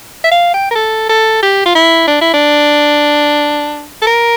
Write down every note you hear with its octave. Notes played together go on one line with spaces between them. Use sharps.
E5
F5
G5
A#4
A4
A4
G4
F4
E4
D4
E4
D4
A4
A#4